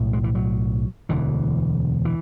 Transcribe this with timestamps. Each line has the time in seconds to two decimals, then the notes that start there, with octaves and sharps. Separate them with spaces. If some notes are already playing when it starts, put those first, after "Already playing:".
Already playing: B1 A2
0.13 G#3
0.24 E3
0.35 F#3
1.09 E1 D2 D3 E3
2.05 E3